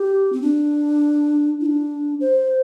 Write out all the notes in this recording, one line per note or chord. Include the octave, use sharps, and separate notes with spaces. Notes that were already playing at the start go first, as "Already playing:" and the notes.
Already playing: G4
C4
D4
E4
D4
C5